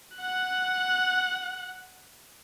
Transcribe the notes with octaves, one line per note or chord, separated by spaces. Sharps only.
F#5 F#6